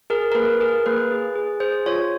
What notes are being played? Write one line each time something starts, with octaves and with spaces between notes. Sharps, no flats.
G#4 A#4
A#4
A#3 B4
G#4 A#4
A#3 B4
G#4
G#4
G#4 C5
F4 C#5